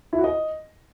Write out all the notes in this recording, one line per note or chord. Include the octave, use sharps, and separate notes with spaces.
E4
F#4
D#5